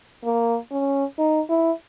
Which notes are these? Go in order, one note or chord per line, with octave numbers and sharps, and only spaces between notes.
A#3
C#4
D#4
E4